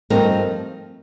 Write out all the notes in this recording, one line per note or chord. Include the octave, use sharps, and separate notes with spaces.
G2 F3 A3 C4 D#4 A#4